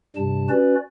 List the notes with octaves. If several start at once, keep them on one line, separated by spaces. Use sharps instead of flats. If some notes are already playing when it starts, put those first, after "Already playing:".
G2 C3 G3 A5
C#4 F#4 B4 D5